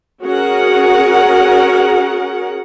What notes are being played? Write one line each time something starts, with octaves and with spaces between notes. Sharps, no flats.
C#4 F#4 G#4 A#4 F#5